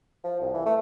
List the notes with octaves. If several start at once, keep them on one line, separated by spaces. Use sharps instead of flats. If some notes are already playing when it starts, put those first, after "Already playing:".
F3
C2
E3
A3